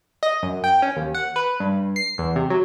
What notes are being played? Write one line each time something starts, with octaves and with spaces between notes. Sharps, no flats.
D#5
F#2
G5
C#4
D#2
F#5
B4
G2
C7
E2
C3
F#3